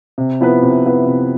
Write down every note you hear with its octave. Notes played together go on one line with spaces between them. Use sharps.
C3
F3 B3 E4 B4
C3
F3 B3 E4 B4
C3